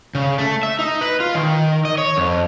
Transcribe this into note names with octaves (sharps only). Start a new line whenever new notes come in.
C#3
A3
E5
D#4
B4
F4
D#3
D#5
C#5
F2